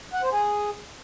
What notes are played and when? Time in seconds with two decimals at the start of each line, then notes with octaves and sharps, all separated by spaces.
0.13 F#5
0.22 C5
0.32 G#4